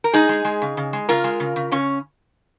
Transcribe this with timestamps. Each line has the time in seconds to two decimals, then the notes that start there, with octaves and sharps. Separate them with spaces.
0.04 A#4
0.13 G#3 D#4 G#4
0.29 G#3
0.45 G#3
0.62 C#3
0.77 C#3
0.93 G#3
1.09 C#3 F4 A#4
1.24 G#3
1.40 C#3
1.56 C#3
1.71 C#3 C#4